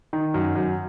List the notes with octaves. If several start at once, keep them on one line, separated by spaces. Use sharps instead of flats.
D#3
F#2
F#2